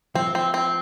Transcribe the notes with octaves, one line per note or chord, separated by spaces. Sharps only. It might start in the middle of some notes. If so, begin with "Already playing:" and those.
F3 C4
C4
C4